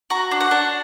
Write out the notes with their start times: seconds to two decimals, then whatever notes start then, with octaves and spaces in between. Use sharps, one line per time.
0.10 F#4 A#5
0.31 D4
0.40 F#5
0.51 D4